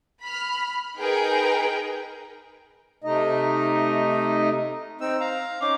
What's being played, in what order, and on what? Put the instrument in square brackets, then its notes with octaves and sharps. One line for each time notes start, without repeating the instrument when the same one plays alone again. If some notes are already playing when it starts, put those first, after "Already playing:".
[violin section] B5 F6
D#4 G#4 A#4 B4 G5
[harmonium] C3 A3 D#4 D#5
[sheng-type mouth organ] C4 D#4 E6
F5 A#5
[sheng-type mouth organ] C#4 D#4 [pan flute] D6